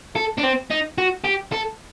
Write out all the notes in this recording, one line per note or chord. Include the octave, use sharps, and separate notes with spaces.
A4
D4
C4
D#4
F#4
G4
A4